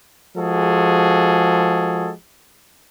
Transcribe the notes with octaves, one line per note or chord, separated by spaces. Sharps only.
F3 G#3 F#4 G#4 A4